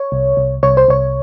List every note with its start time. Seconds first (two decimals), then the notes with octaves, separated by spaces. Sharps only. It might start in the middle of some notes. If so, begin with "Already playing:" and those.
Already playing: C#5
0.12 C2
0.37 C2
0.63 C2 C#5
0.77 C5
0.88 C2 C#5